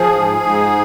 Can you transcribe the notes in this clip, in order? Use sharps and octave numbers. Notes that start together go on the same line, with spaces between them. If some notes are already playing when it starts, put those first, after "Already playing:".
Already playing: F3 G#4
G#2
G#2